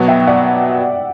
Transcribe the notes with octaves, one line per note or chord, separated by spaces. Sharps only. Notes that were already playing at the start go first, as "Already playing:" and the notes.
Already playing: B2 F#3 B3 F#4
E5 G5
D5 F#5